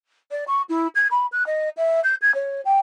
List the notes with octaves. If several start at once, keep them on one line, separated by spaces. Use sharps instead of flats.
D5
C#6
E4
G#6
B5
F#6
D#5
E5
G6
G#6
C#5
G5